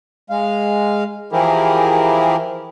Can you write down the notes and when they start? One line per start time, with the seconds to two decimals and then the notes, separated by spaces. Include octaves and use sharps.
0.30 G#3 F5
1.32 E3 F3 E4 G4 G#4 A#4